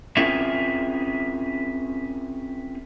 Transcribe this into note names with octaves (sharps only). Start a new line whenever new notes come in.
C4 C#4 F4 G#4 A#4 E5